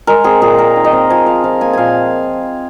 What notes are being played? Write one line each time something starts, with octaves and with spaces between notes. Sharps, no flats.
G#3 A#4
C4 G#4
A#2 G#4
C4 A#4
D#3
D#5
C4
F3 G#5
F3 F5
F3 F5
A#3 G#5
A#2 F5 G#5